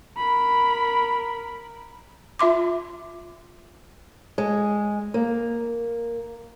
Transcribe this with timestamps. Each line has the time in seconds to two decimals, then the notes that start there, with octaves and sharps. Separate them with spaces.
0.17 A#4 B5
2.39 F4 E5 C6 D6
4.38 G#3
5.14 A#3